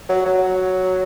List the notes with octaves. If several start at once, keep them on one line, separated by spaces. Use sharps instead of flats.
F#3
F#3